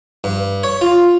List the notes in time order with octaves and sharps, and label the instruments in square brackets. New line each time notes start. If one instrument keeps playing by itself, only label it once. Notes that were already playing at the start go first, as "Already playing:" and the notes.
[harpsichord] G2
C#5
F4